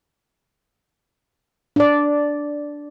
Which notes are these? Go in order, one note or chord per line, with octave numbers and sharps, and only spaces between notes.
D4 D5